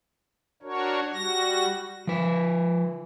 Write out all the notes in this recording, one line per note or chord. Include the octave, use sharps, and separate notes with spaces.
D4 F#4 A#4 C#5
G3 F#4 A#6
F3 B4